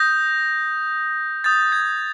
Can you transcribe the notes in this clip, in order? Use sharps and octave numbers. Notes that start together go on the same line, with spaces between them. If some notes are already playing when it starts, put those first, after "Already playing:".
Already playing: D#6 G6 A#6
D#6 G6 A6
G#6